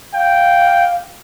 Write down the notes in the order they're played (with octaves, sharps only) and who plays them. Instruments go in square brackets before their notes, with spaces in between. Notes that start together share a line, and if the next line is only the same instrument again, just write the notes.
[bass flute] F5 [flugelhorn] G5